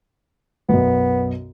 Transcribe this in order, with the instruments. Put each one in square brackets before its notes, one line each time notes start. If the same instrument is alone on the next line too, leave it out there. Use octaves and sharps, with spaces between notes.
[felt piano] B1 F#2 B2 [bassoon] B3